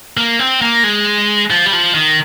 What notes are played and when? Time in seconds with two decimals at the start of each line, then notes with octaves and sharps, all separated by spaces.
0.17 A#3
0.39 C4
0.62 A#3
0.84 G#3
1.50 F3
1.66 G3
1.73 F3
1.95 D#3